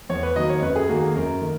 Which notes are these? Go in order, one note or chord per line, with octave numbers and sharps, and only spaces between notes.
E2 C#5
B4
D#3 F#3 A#3 D#5
C#5
F#2 B4
G#4
D#3 A#3 F#4
G#4
F#2 A#4
D#3 A#3